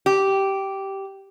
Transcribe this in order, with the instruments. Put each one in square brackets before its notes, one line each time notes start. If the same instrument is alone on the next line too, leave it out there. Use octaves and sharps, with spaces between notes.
[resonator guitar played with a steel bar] G4